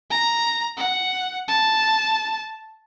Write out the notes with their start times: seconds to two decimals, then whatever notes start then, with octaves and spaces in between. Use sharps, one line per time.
0.10 A#5
0.77 F#5
1.48 A5